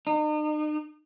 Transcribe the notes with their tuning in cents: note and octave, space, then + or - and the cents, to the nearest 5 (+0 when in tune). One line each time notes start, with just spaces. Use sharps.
D#4 -40